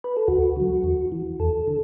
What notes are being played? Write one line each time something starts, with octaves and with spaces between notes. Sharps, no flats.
B4
A4
D2 F#4
D3 F#3
E2
E3
E2 A4
D3